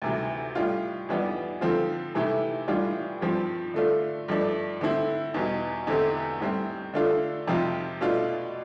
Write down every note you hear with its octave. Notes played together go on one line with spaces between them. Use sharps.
D2 C3 E3
A2 G3 D4 F4
F2 E3 G3 B3 D4
D3 F3 C4 F4
C3 E3 A3 E4 G4
A2 E3 G3 D4 F4
G2 F3 C4
D3 A3 D4 F4
G2 F3 A3 D4
D3 A3 C4 E4
E2 B2 G3
E2 D3 A3 C4 G4
A2 G3 C4
D3 A3 D4 F4
F2 C3 F3 C4 F4
B2 A3 D4 F4